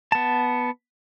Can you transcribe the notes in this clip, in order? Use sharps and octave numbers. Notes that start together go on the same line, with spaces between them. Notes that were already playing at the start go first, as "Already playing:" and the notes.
B3 A5